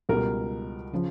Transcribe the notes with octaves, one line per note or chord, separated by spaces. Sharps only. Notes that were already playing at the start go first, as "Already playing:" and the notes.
C#2 B2 G3 A#4
C#3 F3